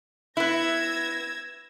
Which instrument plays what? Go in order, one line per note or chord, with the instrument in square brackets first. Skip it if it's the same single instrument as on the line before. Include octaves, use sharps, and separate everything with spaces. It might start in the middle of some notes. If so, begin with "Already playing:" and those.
[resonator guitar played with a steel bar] B3 E4 [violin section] E6 G#6 A#6